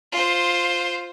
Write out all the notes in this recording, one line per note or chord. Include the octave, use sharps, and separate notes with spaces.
F4 C5